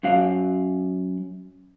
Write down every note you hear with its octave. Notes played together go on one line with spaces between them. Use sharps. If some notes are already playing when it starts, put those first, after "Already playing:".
F#2 F#4 F5